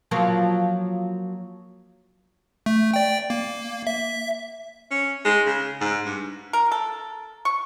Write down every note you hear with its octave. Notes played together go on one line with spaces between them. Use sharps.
F3 F#3 A#3
A3
D5 G5
A#3
E5
C#4
G#3
C#3
G#2
G2
A#4
A4
C#6